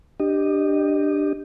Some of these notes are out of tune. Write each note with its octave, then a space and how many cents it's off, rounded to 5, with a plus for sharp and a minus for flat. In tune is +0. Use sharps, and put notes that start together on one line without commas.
D4 +10 G4 +0 D#5 -15